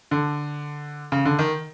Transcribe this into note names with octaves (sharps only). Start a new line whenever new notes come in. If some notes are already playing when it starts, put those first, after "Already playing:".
D3
C#3
D3
D#3